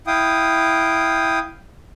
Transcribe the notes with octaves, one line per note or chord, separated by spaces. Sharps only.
E4 F5 G5 D#6